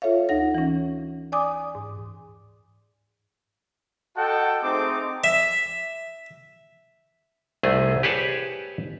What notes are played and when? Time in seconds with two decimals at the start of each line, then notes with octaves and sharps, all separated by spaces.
0.02 F4 A4 C#5 E5 F5
0.29 D2 D#4 A4 F#5 A#6
0.55 E3 C#4
1.32 D5 G#5 D6 D#6
1.75 G#2
4.16 F#4 A4 D#5 F#5 G5 A5
4.62 A3 C4 D#4 G#4 C5 D6
5.24 E5
7.63 C2 A3 G#4
8.03 G4 G#4 B4 C#5 A5